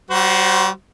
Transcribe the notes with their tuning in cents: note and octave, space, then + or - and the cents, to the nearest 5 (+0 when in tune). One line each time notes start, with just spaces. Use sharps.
G3 -40 F#4 +0 C5 +0